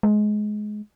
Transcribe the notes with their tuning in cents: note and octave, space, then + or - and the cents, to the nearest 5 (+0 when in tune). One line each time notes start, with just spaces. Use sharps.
G#3 +20